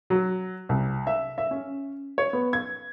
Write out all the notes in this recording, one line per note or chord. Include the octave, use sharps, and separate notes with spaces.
F#3
C2
E5
E5
C#4
C#5
B3
G#6